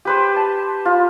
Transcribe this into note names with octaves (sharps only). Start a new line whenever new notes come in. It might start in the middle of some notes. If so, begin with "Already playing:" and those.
G4 B4 C5
A5
F4